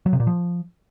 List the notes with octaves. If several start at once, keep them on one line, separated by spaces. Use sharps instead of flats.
F#3
C3
A#2
F3